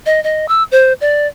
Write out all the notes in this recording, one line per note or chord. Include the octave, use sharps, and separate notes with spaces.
D#5
D#5
E6
C5
D5